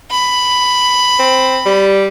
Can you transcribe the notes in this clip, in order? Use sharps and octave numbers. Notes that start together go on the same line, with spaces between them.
B5
C4
G3